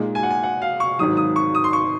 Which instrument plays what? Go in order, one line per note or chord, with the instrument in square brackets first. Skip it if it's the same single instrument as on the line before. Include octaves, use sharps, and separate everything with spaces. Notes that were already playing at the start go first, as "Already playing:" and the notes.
Already playing: [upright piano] A#2 G#3 D#4
[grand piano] G#5
F#5
G#5
F#5
F5
C#6
[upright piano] G#1 G#2 F#3 [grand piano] D#6
[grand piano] D#6
C#6
D#6
C6
C#6